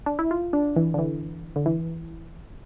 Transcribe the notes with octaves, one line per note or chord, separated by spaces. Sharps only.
D4
E4
F4
D4
E3
D3
E3
D3
E3